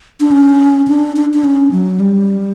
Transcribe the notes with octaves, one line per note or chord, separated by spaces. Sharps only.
D4
C#4
D4
D4
D4
C#4
F#3
G3